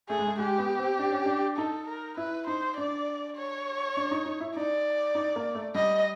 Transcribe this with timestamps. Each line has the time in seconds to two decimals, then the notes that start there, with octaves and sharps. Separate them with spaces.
0.09 A3 G#4
0.19 G#3
0.27 A3
0.39 G#3 G4
0.58 B3
0.79 C4
0.99 D4
1.12 C#4
1.26 D4
1.57 D#4 A4
1.88 A#4
2.17 E4 B4
2.47 D#4 C5
2.77 D4 D5
3.37 C#5
3.97 D4
4.11 D#4
4.26 D#4
4.41 E4
4.56 D#4 D5
5.15 D#4
5.36 A#3
5.55 A3
5.75 G3 D#5